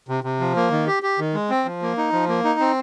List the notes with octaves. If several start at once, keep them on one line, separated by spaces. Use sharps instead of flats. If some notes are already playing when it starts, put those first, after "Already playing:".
C3
C3
F3
A#3
D#3
G4
G4
D#3
G#3
C4
F3
A#3
D#4
F3
A#3
D#4
C4